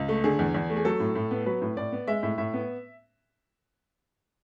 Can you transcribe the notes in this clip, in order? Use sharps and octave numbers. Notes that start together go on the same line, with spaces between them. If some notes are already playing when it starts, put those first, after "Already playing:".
Already playing: C#2
A3
D3 G#4
E2
E2
A3
G#4
F#3 A4
A2
A2
B3
F#3 B4
A2
A2 D5
B3
G#3 E5
A2 E5
A2 E5
B3